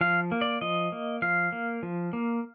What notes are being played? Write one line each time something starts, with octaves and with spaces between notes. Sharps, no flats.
F3 F5
A#3
D5
F3 D#5
A#3
F3 F5
A#3
F3
A#3